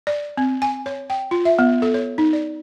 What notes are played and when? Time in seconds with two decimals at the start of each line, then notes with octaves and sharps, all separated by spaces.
0.07 D5
0.37 C4
0.62 G#5
0.86 C#5
1.10 G5
1.31 F4
1.45 E5
1.59 B3
1.82 A4
1.94 C#5
2.18 D#4
2.33 D5